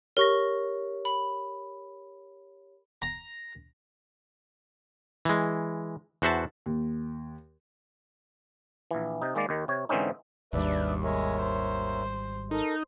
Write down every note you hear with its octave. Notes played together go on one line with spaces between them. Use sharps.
G4 A#4 C#5 C#6 A#6
B5
A#5
E3 G#3
E2 F#4 C5 E5 F#5 A5
D#2
A#1 E3
C3 D#4
D#3 G#3 A#3 D5
D#2 D#3
C3 C#5
G#2 D3 E3 C4 C#4 D#4
G#1 D#2 G3 D4 B4 D5 E5
G#3 A#4 C#5 E5
C5
D#4 A4 A#4 D#5